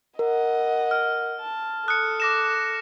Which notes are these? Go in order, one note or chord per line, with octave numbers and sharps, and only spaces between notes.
A#4 D#5 F#5
F6
A5
A4 D#6 F#6 C#7
D6 A#6 E7